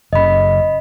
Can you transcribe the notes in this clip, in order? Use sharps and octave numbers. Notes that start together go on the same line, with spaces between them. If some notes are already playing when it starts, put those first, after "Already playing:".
F#1 C#3 D#5 B5